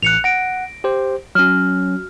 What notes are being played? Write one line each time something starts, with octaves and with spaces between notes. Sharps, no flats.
A1 F#6 C#7 F7
F#5 A#6 D7
G4 C5
F#3 C#4 F#4 F6